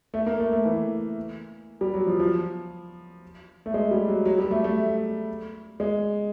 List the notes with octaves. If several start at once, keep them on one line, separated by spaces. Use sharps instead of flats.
A3
A#3
A3
A3
E3
G3
F#3
F3
F3
A3
G#3
G3
F#3
F#3
G3
A3
A3
G#3